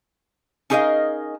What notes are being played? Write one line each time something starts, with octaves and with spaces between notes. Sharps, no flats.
C#4 D#4 G#4 A#4 D#5 F5